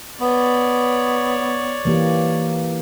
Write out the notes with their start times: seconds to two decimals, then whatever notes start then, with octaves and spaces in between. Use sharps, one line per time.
0.21 B3 C#5 D5
1.85 E3 A#3 G4